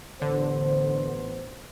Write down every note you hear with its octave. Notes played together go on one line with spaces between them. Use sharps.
A1 D3 B3 C5